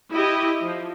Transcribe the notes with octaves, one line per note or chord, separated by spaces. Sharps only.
E4 G4 D#5
F3